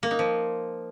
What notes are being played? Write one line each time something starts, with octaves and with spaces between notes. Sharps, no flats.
A#3
D#4
F3